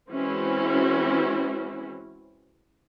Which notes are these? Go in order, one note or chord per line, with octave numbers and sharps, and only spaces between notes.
E3 G#3 C4 C#4 E4 F#4